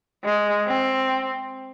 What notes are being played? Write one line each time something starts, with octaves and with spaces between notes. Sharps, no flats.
G#3
C4